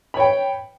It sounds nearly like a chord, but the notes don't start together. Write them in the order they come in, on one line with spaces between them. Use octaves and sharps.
B5 C#5 G5